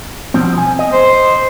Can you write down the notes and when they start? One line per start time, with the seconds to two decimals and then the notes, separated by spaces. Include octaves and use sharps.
0.34 B2 F3 C4
0.58 G#5
0.79 D#5
0.93 C5